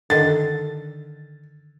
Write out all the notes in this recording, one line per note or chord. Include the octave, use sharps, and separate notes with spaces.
D3 D#3 A6